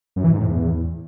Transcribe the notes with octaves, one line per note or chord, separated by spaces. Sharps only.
F#2
E3
G#2
A2
E2